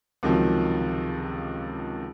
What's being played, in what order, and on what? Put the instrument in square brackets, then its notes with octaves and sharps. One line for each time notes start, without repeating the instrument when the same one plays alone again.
[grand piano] C#2 C3 D#3 F3 F#3